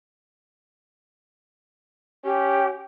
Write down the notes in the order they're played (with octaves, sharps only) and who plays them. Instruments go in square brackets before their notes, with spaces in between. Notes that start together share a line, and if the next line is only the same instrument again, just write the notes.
[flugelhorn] C#4 [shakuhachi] G4